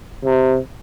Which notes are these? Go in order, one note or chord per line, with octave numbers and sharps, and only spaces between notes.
C3